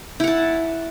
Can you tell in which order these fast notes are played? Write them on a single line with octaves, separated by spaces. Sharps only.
E4 F#5 A5